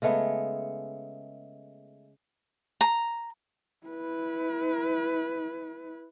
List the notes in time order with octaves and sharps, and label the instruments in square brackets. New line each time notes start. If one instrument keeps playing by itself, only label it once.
[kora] C#3 G#3 A3 B3
[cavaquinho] A#5
[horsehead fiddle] E4 B4